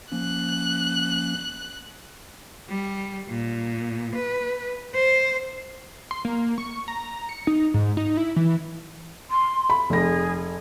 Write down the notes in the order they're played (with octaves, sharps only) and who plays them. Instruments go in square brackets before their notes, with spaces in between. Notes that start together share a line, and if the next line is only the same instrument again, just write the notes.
[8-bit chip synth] F3 A#3 C#4 [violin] F#6
[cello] G3
A#2
B4
C5
[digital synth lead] C6
A#3
C#6
A#5
C#7
D#4
G#2
D#4
E4
E3
[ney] C6
[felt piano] B5
[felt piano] F1 A#6 [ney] G#4